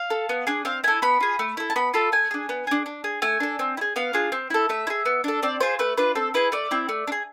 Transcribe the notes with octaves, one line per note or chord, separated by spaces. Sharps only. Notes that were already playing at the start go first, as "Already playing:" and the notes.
Already playing: F5
A4
B3
D4 G#4
C4 F5
E4 A4 G#5
B3 B5
F4 G#4
A3
E4 A4
A5
B3 B5
F4 A4 B5
A3 G#5
D4 G#4
B3
D4 G#4
D4
G#4
A3 G#5
D4 A4
C4
E4
G#4
B3 F5
D4 F4 G#4
C4
E4 A4
A3 E5
E4
G#4
B3
D4 A4
C4 D5
F4 G#4 C5
A3 B4
D4 F4 B4
C4 A4
E4 G#4 B4
A3 D5
C4 E4
A3
D4
G#4